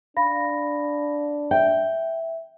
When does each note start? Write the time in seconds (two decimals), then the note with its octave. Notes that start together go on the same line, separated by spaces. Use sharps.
0.17 D4 F5 B5 A#6
1.51 E5 G5